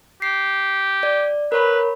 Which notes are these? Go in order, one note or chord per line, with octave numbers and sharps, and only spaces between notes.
G4 C7
D5
A#4 B4 C#5 B5